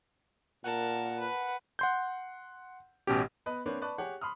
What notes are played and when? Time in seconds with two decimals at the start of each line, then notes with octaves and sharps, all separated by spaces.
0.64 A#2 A#4 F#5 A5
1.20 B4
1.79 F#5 C6 G6
3.07 A1 B2 C#4 G4
3.46 B3 B4 D#5
3.66 A#3 C4 D4 B4 C#5
3.82 B4 D5 A5 C#6 F#6
3.98 G4 G#4 C#5 F#5
4.21 B5 C6 D#6 F6